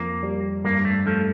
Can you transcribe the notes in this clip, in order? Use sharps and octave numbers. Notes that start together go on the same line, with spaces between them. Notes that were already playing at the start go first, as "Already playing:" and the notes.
Already playing: F2 F3 A#3
G3
G2 A#3
A3
F3 A3